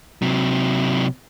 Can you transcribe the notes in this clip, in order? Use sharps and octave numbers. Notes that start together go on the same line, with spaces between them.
C3 F#3